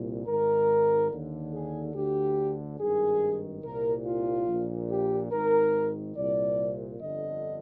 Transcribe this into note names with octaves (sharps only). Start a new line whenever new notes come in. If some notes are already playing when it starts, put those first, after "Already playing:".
Already playing: C2 A#2
G#1 G#2 D#3 A#4
D#2 D3
G#4
D2 D3 G4
G#1 G2 D#3 G#4
C2 A#2 A#4
F4
A#1 A#2
G4
G#1 G#2 D#3 A#4
C2 A#2 D5
G1 F2 D3 D#5